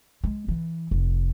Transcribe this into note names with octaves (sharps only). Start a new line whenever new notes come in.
G#3
E3
F1